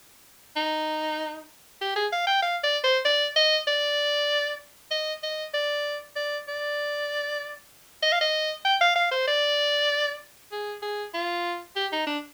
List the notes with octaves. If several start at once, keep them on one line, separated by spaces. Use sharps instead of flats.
D#4
G4
G#4
F5
G5
F5
D5
C5
D5
D#5
D5
D#5
D#5
D5
D5
D5
D#5
F5
D#5
G5
F5
F5
C5
D5
G#4
G#4
F4
G4
D#4
D4